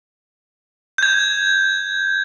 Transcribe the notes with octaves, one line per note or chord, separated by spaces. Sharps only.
G6 G#6